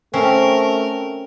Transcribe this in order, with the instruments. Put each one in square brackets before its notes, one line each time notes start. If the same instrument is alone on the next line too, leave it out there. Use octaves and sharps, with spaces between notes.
[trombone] A3 [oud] C4 [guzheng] C#4 [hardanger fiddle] A#4